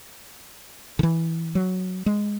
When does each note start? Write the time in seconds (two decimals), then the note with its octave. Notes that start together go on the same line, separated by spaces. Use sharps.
0.99 D3
1.03 E3
1.55 F#3
2.06 G#3